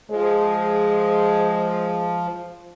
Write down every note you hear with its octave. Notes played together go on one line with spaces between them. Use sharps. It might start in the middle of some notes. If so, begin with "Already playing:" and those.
F3 G#3 G#4 C5